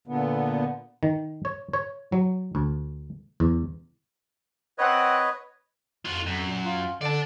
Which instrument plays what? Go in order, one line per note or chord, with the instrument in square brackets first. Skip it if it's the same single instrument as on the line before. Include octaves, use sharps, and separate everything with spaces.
[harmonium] A#2 D3 B3
[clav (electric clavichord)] D#3
C#5
C#5
F#3
D2
E2
[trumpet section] C4 F#5 [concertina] B4 C#5 D#5
[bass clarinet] F2 [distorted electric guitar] F4 F#4
[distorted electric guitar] F#2
[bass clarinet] A#2
F4
[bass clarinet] D3 [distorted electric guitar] D5 A5